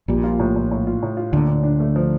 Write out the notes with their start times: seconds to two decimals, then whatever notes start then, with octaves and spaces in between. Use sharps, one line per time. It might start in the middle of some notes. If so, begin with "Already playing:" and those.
0.08 A#1 A#2 G3
0.24 F4
0.39 A2
0.56 A2
0.71 A2
0.87 F4
1.03 A2
1.17 F4
1.33 D2 A#2 D3
1.48 D4
1.63 D4
1.80 A3
1.96 F3